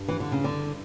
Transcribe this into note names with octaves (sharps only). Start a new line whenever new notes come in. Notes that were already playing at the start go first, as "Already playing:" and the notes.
Already playing: G2
E3
D3
C#3
D3